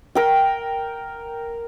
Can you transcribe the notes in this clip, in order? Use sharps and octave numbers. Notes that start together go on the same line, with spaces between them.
A#4 G5